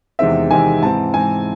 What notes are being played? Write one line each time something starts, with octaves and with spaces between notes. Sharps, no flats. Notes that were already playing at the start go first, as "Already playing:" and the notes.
E2 C3 D#3 G#3 C4 E5
E2 C3 D#3 G#3 C4 G#5
G#2 E3 C4 A5
G#2 E3 C4 G#5